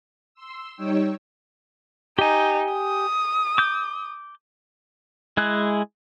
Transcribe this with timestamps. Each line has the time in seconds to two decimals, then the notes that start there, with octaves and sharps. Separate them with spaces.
0.34 C6 E6
0.76 G3 D#4 C#5 G5 E6
2.19 D#4 G4 G#5
2.73 D#6
3.58 D6 G6
5.37 G#3 E4 G#4 F#6